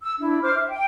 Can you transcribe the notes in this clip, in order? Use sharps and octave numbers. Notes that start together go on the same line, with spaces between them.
E6
D4 E4
C5 D6 F6
E5
G5